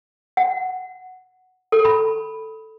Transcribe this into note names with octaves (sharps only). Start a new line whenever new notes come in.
F#5
A4
B5